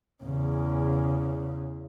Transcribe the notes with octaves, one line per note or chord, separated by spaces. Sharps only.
E2 C#3